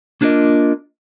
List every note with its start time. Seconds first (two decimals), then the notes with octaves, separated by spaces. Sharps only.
0.21 A#3 D4 F4 G#4 A#4 D#5